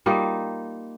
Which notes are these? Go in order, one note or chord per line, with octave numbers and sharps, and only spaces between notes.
G3 A#3 D#4 F4